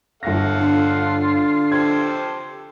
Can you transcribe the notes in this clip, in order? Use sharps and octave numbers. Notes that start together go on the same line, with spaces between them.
G1 A4 F5 F#5 A#6
D3 F4
G4 A4 C5 G#6